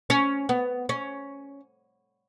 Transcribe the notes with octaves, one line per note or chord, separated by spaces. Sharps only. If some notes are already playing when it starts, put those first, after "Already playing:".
C#4
B3
C#4